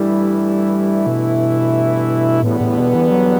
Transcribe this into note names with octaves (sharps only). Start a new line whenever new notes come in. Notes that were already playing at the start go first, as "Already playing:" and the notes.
Already playing: G2 E3 G3 A3 E4
B2
E2 A2 D3 G3 B3
A2
B2
E3
F#3